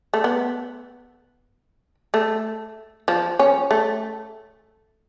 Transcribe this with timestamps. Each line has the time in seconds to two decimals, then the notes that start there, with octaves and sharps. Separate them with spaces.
0.14 A3
0.24 B3
2.14 A3
3.08 F3
3.39 C#4
3.71 A3